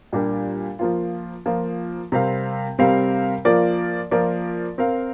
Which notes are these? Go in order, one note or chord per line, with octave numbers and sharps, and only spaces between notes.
A#2 G3 D4 G4 A#4
F3 A#3 F4
F3 A#3 F4
C3 G3 C4 A#4 F5
C3 G3 C4 A#4 F5
F3 A#3 F4 A#4 D5
F3 A#3 F4 A#4 D5
C4 A#4 F5